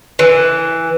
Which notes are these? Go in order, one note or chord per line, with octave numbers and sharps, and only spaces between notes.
E3